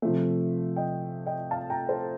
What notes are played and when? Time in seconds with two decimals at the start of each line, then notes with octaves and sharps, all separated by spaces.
0.02 C3 F3 A3
0.76 D#5 G5
1.26 D#5 G5
1.51 F5 A5
1.70 G5 A#5
1.89 A4 C5